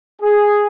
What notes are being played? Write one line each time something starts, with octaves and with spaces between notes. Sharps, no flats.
G#4